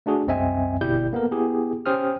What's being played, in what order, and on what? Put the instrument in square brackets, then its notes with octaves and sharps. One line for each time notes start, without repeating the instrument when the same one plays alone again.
[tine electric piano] A3 D4 F#4 G#4
C2 F#2 C4 D#5 E5 G#5
G1 B2 E4 G4 D5 G6
A#3 B3 A4 A#4
B3 E4 G4 G#4
C#4 G4 C5 G5 D#6 F6